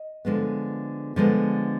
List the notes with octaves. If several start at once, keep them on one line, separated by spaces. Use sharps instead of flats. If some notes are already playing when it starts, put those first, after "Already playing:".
Already playing: D#5
D3 F3 G#3 B3
D3 F3 G#3 B3